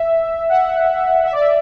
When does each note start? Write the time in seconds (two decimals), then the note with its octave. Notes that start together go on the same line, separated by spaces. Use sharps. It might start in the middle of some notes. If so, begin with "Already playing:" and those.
Already playing: E5
0.49 F#5
1.25 E5
1.32 D5
1.40 E5